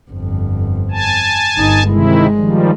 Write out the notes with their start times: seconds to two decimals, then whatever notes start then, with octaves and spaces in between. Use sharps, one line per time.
0.11 G1 F2
0.91 G#5 A5
1.56 G1 D#4
1.88 C3 D#3 G#3 E4
2.35 D#3 F3 G3